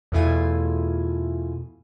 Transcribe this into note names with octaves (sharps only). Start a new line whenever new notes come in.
E2 B2 A3 E4 F4 G#5